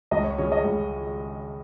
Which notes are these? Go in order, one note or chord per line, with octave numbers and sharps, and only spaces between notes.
C#2 D#5
C#5
C#3 G#3 C#4 C#5
D#5
C#2